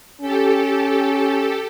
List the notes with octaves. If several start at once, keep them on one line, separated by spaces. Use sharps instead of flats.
C#4 G4 A4